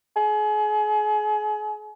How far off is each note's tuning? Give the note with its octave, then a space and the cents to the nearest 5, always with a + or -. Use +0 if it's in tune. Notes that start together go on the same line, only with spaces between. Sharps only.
G#4 +35